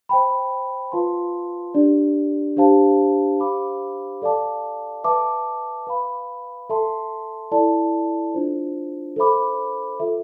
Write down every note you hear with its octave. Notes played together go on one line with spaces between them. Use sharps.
C5 G5 B5
F4 B4 F5 A5 C6
D4 G4 D5
D4 G4 C5 F5 A5
G4 C5 F5 B5 D6
A4 D5 F5 A5 D6
B4 E5 A5 D6
B4 F5 B5
A4 E5 A5 C6
E4 A4 D5 A5
D4 F4 C5
A4 C5 E5 B5 D6
F4 A4 E5